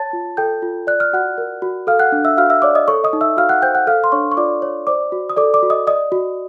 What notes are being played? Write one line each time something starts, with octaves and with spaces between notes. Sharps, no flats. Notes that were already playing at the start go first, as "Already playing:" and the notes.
Already playing: C#5 A5 A6
F4
A4 G5 G6
F4
D5 F#6
F6
F#4 F#5 F#6
A#4
F#4
A4 F5 F6
F#5 F#6
D4
E5 E6
F#4 F5 F6
E5 E6
C#5 D5 D6
D#5 D#6
A4 C#5 C#6
D#5 D#6
D#4
E5 E6
F#4 F5 F6
F#5 F#6
C5 G5 G6
F#5 F#6
A4 F5 F6
C6
D4 C#5 C#6
C#6
F4 D5 D6
C#5
C5 D5 D6
F#4
D#6
A4 D5 D6
D5 D6
F#4
D#5 D#6
D5 D#5 D#6
F#4